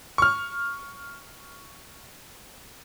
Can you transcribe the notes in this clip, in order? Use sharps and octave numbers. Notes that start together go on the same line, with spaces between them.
C#6 F6